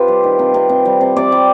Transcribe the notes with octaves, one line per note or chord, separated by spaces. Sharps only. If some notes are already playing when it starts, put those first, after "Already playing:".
Already playing: C3 F4 G4 B4
G3
D#3
C3
C3
C3
G3
C3
C3 D5
G3